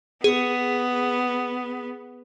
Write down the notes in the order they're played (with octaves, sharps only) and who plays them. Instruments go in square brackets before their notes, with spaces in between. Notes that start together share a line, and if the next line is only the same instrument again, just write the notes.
[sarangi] B3 [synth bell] G#4